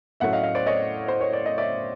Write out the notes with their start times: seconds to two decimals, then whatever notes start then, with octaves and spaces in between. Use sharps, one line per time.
0.20 A2 F#3 A3 C#4 E5 F#5
0.33 D#5 F5
0.43 D#5 F5
0.55 C5 D5
0.67 C#5 D#5
1.08 C5
1.21 C#5
1.33 D5
1.46 D#5
1.58 D5 E5